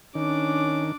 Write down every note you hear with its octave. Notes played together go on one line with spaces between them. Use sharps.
D#3 C#4 D4 D6